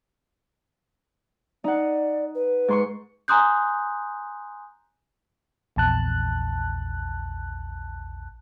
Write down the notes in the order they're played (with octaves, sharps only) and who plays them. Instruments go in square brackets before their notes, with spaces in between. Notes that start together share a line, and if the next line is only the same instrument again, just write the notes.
[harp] D#4 F#5 [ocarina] D5
[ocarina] B4
[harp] G#2 C6 C#6
[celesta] G#5 A#5 C6 D#6 F#6 G6
[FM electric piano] A#1 E2 A5 F#6